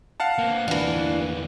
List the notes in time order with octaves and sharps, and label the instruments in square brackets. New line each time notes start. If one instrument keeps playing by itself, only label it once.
[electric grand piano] F5 F#5 A5
[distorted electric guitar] A#3 C4
[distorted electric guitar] E2 A#3 [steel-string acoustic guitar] E3 D4